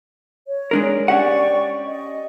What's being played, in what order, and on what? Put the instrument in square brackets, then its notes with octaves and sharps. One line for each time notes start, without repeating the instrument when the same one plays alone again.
[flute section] C#5
[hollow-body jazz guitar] G#3 D4 A#4
[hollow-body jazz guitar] C#4 G4 F#5 [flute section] D5 G5 C#6
[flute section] D#5